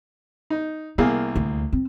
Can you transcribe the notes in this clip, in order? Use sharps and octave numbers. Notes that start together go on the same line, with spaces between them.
D#4
C2 A#3 B3 G#4
D2
C4